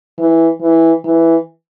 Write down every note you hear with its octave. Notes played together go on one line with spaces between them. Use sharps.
E3
E3
E3